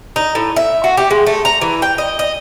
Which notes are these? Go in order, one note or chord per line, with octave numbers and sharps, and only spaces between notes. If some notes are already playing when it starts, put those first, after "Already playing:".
D#4
A2
E5
F#4
G4
G#3
A3
A#5
E3
G5
D#5
D#5